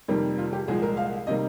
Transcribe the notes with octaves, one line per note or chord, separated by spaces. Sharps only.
F2 C3 D#3 G3 A#3
F4
G4
C2 A#2 F3 G#3 G#4
A#4
F5
C3 D#3 G3 A#3 D#5